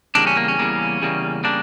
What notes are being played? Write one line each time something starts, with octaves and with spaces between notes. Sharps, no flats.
E2 C#3 G3 A#3 D4
C#4
A#3
C#4
E2 C#3 G3 A#3
E2 C#3 G3 A#3
C#3 G3 A#3 D4